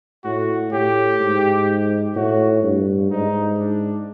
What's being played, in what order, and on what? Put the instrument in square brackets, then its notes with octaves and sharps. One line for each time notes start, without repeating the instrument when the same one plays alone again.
[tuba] A2 [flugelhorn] F#4
[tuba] A2 [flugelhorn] G4
[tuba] G#2
[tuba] A2 [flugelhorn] F#4
[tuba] G2
[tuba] G#2 [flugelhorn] D#4
[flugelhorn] D4